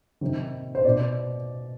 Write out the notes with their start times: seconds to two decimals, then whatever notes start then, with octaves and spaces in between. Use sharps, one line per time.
0.21 C3 D#3
0.75 C5
0.84 B2 D5